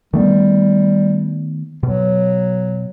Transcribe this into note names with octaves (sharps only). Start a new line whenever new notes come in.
D#3 G3 A3 B3
B2 F#3